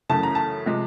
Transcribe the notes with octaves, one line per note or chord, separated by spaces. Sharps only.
F#2 C#3 E3 A3 A5
A#5
A5
C3 F3 G#3